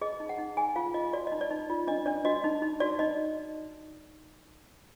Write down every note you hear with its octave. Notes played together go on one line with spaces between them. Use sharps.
G#4 D#5
D#4
F#5
D#4
G#4 G#5
F4 F5
F4 D#5
F#4 D5
D#4 D#5
D5
D#4
F4
D4 D#5
D4 D5
F#4 D#5
D#4
D#4
F#4 D5
D#4 D#5